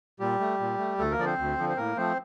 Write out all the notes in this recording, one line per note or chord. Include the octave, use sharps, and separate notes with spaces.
A#2 G3 G4
A3
A#2
A3
D2 A3 A4
A#3 A#4
D3 F3 D5
C4 C5
D2
D3 F3
C5
A2 A#3 A#4
F3 A3 C4 C5